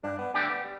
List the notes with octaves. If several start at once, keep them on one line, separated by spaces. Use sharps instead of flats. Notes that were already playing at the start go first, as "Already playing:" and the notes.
G2 D4
B3
D3 A3 D4 G4
B3
G3